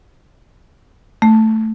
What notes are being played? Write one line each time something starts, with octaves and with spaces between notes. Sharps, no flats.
A3